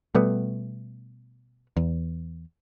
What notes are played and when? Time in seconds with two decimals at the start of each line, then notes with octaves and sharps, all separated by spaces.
0.15 B2 G3 A3 B3
1.77 E2